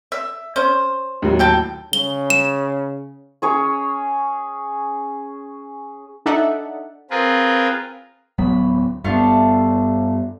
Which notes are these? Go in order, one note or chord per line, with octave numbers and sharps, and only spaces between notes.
E5
C#4 C5
D#2 A2 F#3
E4 G5 A5
C#3 G7
E7
C#4 G#4 C#5
D4 D#4 A4 D5 E5 F#5
C4 F4 G#4 A#4 B4
D1 F#3 B3 B5
G2 A3 B3 D4 F4